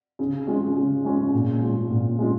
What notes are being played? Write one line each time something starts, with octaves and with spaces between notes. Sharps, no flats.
C#3
G#3 C#4 F4
C#3
G#3 C#4 F4
A#2
G#3 C#4 F4
A#2
G#3 C#4 F4